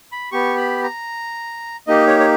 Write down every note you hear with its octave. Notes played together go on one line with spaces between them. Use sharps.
B5
B3 G4 C#6
B5
A#5
A#3 D#4 G4 D#5
C#5
C#5